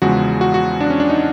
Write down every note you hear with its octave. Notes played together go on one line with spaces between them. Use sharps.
E2 C#3 F3 G#3 F#4
F#4
F#4
D4
C#4
D4
D#4